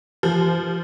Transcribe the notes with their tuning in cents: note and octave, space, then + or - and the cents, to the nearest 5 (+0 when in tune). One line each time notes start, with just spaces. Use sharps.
F3 -25